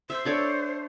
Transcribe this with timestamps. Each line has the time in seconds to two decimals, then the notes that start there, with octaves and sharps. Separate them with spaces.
0.10 C5 E5
0.25 D4 A4 C#5